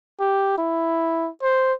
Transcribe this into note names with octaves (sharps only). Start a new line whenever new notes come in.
G4
E4
C5